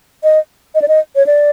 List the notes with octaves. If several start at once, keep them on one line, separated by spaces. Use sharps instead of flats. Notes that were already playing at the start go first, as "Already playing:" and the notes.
D#5
D#5
D5
D#5
C#5
D5